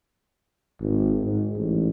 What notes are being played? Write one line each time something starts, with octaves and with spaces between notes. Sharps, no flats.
G#1
G#2
A1